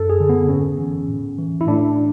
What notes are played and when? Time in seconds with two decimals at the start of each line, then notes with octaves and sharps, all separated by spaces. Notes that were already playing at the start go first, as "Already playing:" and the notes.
Already playing: F#2 A4
0.10 G#4
0.20 D3
0.29 B3
0.49 G#2 C#4
0.78 E3
1.08 A2
1.38 E3
1.61 E4
1.67 A2 D4